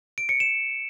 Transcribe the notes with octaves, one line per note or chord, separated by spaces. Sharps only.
D7
C#7
E7